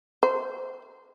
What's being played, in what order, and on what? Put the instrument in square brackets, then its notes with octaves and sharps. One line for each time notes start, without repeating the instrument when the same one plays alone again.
[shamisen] C5